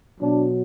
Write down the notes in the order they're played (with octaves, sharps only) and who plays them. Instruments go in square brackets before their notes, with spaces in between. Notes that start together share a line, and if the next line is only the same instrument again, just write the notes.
[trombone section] B2 F#3 D4